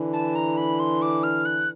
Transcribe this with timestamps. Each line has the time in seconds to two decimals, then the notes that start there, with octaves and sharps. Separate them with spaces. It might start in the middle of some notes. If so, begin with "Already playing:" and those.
Already playing: D3 E3
0.13 A5
0.35 A#5
0.57 B5
0.79 C6
1.02 D6
1.23 F6
1.45 F#6